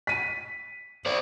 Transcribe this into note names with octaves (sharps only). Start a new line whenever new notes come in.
B6 D#7
C5 D5